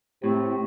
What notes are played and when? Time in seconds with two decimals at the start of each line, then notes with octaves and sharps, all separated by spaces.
0.23 A2 C3 C4